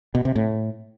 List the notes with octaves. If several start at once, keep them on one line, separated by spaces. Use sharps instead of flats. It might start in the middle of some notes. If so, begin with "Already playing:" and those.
B2
C3
A2